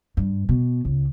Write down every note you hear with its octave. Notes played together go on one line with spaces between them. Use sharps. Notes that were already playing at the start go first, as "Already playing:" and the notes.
G2
B2
C#2